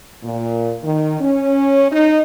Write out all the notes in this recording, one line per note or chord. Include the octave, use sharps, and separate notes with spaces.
A#2
D#3
C#4
D#4